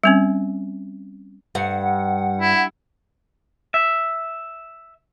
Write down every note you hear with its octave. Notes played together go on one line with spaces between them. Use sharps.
G3 C4 C#4
G2 F#5
E4
E5